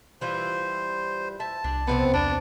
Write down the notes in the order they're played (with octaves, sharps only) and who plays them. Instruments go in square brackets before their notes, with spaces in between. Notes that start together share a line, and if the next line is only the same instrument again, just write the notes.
[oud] E3 G3 F4 [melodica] C5
[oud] E5 [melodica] A5
[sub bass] C2 [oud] D4
[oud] F2 C3 C4 [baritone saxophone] B3
[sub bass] E2 [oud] B3 [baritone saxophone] D4